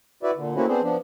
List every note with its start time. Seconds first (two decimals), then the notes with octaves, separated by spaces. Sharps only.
0.23 E4 F#4 B4 D5 E5
0.36 A#2 D3
0.55 A3 A#3 C4 C#4 E4 F#4
0.68 B3 C4 D4 G#4 C5
0.82 F3 B3 D4